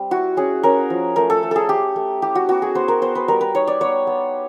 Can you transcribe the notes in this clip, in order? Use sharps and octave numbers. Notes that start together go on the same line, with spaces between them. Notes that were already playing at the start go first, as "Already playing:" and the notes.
Already playing: G3 C4
E4 F#4
C#4 G#4
C#4 A#4
F3
A3 A#4
A4
A3
G#4 A4
A3 G4
A3
E4 G4
F#4
B3 F#4
G#4
B3 C5
A#4
B3 C5
B4
G3 A#4
B4
D#4 C#5
D5
B3 C#5
B3